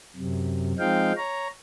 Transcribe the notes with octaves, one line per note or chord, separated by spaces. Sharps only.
F#2 C3
F3 G#3 C4 D#4 F5 G5
C#5 A#5